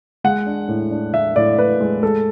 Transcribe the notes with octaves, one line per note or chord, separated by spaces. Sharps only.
G#3 F#5
D4
A2
D4
A2 E5
A2 D5
A2 B4
G#3
G#3 A4